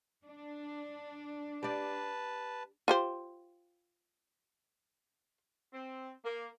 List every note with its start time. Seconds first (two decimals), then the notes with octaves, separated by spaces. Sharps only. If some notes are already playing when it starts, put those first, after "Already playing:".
0.23 D4
1.63 G4 B4 D5 A5
2.88 F4 G4 C5
5.73 C4
6.25 A#3